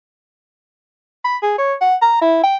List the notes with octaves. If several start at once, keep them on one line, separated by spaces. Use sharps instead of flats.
B5
G#4
C#5
F#5
A#5
E4
G5